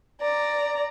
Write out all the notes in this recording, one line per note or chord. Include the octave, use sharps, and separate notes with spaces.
D5 A#5